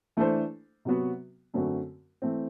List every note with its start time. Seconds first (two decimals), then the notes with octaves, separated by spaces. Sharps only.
0.17 E3 A3 D4 A4 C5
0.85 C3 F#3 B3 F#4
1.54 F#2 D3 A3 C4 F#4
2.22 E3 A3 C4